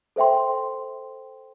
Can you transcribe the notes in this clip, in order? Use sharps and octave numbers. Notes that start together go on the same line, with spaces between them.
A4 C5 E5 G5 C6